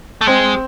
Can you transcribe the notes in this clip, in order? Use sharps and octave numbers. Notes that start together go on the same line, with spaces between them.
A3
G#3 C4